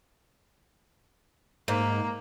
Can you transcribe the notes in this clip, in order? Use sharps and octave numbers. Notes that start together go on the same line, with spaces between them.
G#2 A#3